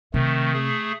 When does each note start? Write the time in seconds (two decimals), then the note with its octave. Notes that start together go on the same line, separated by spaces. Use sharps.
0.14 C3 D#3 A3
0.53 A3 G#4